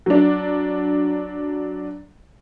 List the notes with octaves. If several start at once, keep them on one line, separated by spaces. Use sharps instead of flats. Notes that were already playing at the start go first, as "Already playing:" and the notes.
F#3 D4